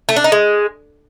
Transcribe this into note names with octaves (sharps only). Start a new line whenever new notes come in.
A3
D4
D#4
G#3